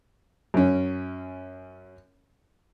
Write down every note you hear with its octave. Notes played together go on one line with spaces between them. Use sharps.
F#2 C#4